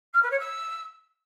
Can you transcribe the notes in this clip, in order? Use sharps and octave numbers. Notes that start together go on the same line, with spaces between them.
F6
B4
C#5
E6